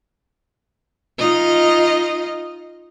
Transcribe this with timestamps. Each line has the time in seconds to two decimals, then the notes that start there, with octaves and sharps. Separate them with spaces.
1.19 D#4 F4 D#5